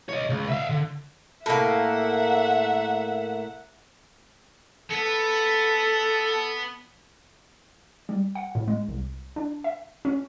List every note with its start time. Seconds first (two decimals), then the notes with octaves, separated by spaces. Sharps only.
0.09 C#5 D#5
0.29 C#2
0.49 E5 F5
0.69 D3
1.46 A2 A#3 E5 F#5
4.91 B3 A4 B4
8.09 G3
8.35 F#5
8.55 A2
8.68 G#3
8.88 C2
9.36 D4
9.64 E5
10.05 C#4